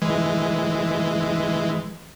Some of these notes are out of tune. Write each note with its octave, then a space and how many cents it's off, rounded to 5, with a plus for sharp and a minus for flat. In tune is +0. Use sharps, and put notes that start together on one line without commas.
E3 +0 G#3 +0